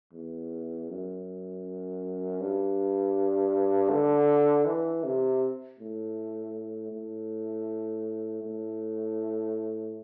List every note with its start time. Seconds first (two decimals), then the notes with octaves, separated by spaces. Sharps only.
0.13 E2
0.89 F#2
2.40 G2
3.90 D3
4.65 E3
5.04 C3
5.79 A2
6.92 A2
8.43 A2